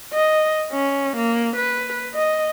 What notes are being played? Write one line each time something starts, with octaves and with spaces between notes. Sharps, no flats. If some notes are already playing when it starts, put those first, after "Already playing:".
D#5
C#4
A#3
B4
D#5